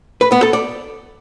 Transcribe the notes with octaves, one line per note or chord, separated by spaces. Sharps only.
B4
B3
A4
D5